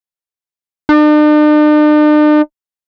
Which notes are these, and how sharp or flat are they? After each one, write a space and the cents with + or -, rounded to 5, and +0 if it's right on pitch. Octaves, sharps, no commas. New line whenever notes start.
D4 +45